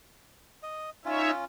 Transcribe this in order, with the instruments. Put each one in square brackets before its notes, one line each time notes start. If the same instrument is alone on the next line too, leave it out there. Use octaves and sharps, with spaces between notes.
[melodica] D#5
[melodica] C#4 F4 [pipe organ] D#4 C#5 E5